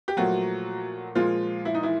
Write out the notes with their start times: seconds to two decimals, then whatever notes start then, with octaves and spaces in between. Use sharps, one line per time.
0.08 G4
0.17 A#2 F3 F#3 A3 F#4
1.15 A#2 F3 G#3 F4
1.65 E4
1.75 D#4
1.83 E3 E4